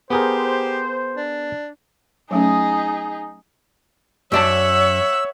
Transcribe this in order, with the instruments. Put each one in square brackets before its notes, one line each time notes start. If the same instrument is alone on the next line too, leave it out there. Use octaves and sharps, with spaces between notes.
[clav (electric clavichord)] B3 G#4 A#4 [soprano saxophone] G4 [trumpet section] C5
[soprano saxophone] D4
[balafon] F#3 A3 C#4 [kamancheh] D#4 G#4
[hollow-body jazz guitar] F#2 D5 A5 [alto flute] C#5 [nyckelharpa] E5 F#5 [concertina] E6